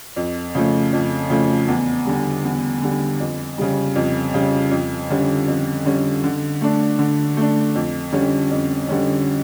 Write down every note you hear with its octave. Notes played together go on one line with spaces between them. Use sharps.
F2
C#3 F3 A3
F2
C#3 F3 A3
E2
D3 G3
E2
D3 G3
F2
C#3 G3
F2
C#3 G3
F2
D3 G3 C#4
F2
D3 G3 C#4
D3
A3 D4
D3
A3 D4
F2
D3 G3 C#4
F2
D3 G3 C#4